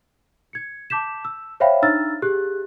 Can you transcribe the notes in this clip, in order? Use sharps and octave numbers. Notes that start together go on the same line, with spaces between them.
G#6 C#7
A5 D6 G6 B6 E7
E6
C5 C#5 E5 F5 G5 B5
D4 D#4 A#5 E6 F6 A6
G4 G#4 F#6